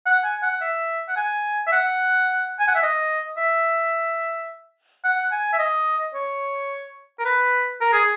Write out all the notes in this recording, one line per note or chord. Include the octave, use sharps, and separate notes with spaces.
F#5
G#5
F#5
E5
F#5
G#5
E5
F#5
G#5
F#5
E5
D#5
E5
F#5
G#5
E5
D#5
C#5
A#4
B4
A#4
G#4